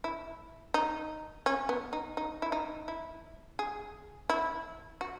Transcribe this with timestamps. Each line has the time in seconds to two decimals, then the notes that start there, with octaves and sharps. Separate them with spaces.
0.04 E4
0.74 D#4
1.46 C#4
1.69 B3
1.93 D#4
2.17 D#4
2.42 E4
2.52 D#4
2.88 E4
3.59 G#4
4.30 E4
5.01 F#4